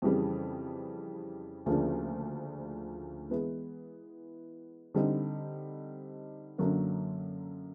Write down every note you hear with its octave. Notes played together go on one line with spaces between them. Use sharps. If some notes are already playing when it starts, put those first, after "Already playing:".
F2 C#3 E3 G3
D2 C#3 F3 A#3 D4
E3 G#3 B3 E4
D3 G3 C4 D#4
F#2 D3 F#3 A#3